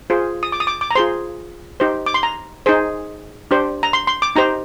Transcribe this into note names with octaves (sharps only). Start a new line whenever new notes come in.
F4 G#4 C5
D#6
D6
D#6
D6
D6
A#5
F4 G#4 C5 C6
D#4 G4 C5
D6
C6
A#5
D#4 G#4 C5
D4 G4 C5
A#5
C6
C6
D6
D#4 G4 C5 A#5